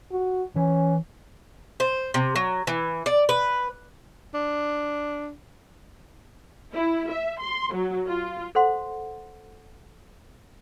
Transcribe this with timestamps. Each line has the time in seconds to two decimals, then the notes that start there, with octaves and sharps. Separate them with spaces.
0.12 F#4
0.56 E3 C#4
1.80 C5
2.14 C3
2.36 F#3
2.67 E3
3.06 D5
3.29 B4
4.34 D4
6.73 E4
7.10 E5
7.40 C6
7.74 F#3
8.07 F4
8.55 A4 C5 F#5 C6